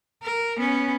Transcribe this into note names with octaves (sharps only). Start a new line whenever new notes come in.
A#4
B3 C#4